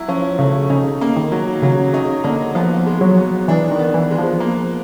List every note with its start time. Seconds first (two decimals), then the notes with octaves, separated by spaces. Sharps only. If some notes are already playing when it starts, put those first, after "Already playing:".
Already playing: F#3 E4
0.08 F3 C#4
0.39 C#3 A3
0.70 C#3 D#4
1.01 A#3
1.16 D#3
1.32 F#3
1.62 C#3 F#3
1.93 C#3 D#4
2.24 D3 A#3
2.55 F3 B3
2.86 G#3
3.01 F#3
3.17 B2
3.48 E3 D4
3.72 D#3
3.79 B3
3.94 E3
4.10 G#3
4.18 F3
4.40 A#3